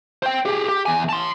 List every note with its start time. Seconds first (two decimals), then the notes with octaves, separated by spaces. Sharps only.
0.23 C5 G5
0.45 G4 G#4
0.69 G4
0.86 E2 G#5
1.09 A5 C6